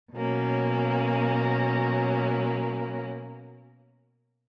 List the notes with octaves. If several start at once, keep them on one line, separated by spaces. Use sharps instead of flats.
B2 F#3 A#3 C#4